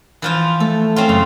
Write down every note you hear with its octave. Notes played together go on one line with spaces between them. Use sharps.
E3 F3 F4
A3 A4
C4 C#4 F4
F#2 C#3